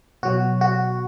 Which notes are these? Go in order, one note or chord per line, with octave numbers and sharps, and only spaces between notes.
B2 F#3 F#4
F#4